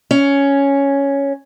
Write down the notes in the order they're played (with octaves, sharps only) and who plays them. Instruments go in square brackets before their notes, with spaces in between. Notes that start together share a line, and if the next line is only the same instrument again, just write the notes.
[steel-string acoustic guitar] C#4